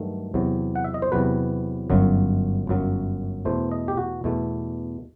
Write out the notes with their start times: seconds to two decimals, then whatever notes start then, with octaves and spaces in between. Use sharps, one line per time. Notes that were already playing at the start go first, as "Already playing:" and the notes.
Already playing: G2 D#3 F#3 A3
0.34 E2 C3 F#3
0.76 F#5
0.84 E5
0.94 D#5
1.02 C5
1.12 E2 C3 F#3 B4
1.90 G1 F#2 F#3
2.67 G1 F#2 F#3
3.45 E2 B2 A3 C5
3.72 D#5
3.88 G4
3.97 F#4
4.24 E2 B2 A3